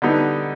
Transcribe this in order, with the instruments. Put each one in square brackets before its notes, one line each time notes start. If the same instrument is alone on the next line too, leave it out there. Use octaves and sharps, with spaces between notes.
[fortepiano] D3 G3 B3 D#4